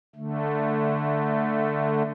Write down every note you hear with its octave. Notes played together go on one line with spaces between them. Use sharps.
D3 A3